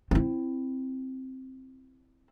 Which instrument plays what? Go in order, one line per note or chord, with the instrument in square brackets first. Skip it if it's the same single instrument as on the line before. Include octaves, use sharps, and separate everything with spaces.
[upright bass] C4 E4